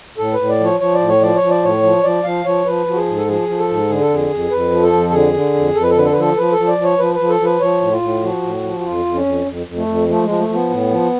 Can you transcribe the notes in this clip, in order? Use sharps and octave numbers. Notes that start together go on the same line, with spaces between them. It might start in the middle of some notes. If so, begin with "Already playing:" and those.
A2 A4
B4
A2
D5
F3 C#5
F3 C#5
D5
A2
C#5
F3 D5
C#5
F3
D5
A2 C#5
F3
F3 D5
F3 F5
F3 C#5
F3 B4
F3 F#4
G#4
G#2
A4
F3 G#4
F3
A4
G#2
D3 G#4
A4
F2 G#4
F2
F2 B4
F3
A4
F2
A4
D3 G#4
D3
F2
F2 A4
B4
A4
D3 B4
A4
B4
F3 A4
F3 B4
A4
F3
D5
F3
C#5
F3 B4
F3 B4
A4
F3
B4
F3 C#5
A2
F4
A2
F3 F#4
A2
F3
F#4
F2 F4
F2
C#4
F2
F2
F2
A3
F2
F3 A3
F3 G#3
A3
F3
B3
A2
F3